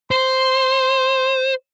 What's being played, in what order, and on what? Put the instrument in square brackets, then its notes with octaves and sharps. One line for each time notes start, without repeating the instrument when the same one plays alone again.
[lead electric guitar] C5 [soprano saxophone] C6